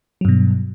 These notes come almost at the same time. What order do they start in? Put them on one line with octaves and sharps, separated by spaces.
F#3 G2 B2